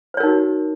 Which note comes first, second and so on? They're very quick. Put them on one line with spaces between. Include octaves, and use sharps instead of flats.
C5 C#5 A#4 D#4 F#4